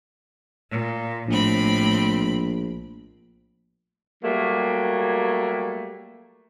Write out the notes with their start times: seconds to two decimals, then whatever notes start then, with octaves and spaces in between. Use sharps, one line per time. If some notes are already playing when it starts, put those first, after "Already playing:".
0.70 A#2
1.28 A#1 A2 C4 B5
4.23 F#3 G3 A3 A#3